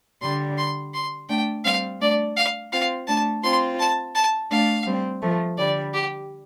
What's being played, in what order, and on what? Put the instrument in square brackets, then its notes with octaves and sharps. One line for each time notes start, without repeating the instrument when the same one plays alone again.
[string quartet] D3 G3 [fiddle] C6
[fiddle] C6
C6
[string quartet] A3 D4 [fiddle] G5
[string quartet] G3 C4 [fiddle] F5
[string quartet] A3 D4 [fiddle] D5
[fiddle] F5
[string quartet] C4 F4 [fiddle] F5
[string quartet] A3 D4 [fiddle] A5
[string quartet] C4 F4 [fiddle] C6
[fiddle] A5
A5
[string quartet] A3 D4 [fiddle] F5
[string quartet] G3 C4
F3 A3
[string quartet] D3 G3 [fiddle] D5
[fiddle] G4